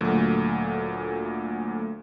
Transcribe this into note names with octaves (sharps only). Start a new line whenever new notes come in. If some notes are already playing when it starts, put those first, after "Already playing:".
D2 A#2 F#3 A3